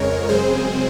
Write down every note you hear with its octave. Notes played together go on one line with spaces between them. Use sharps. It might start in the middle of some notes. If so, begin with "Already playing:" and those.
Already playing: F2 C#3 G#3 A#4 C#5
F#2 C#3 G#3 C4 G#4 C5